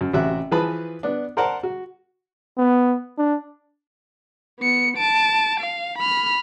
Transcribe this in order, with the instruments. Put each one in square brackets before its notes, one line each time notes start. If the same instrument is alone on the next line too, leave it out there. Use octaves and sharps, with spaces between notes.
[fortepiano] F#2
A1 C3 F#4 E5 F#6
E3 F3 G#4 B4 A5 B5
B3 D4
A#4 C5 D5 F#5 A5 A#5
F#4
[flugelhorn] B3
D4
[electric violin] B3 C#7
A5 D7
F5
B5 F6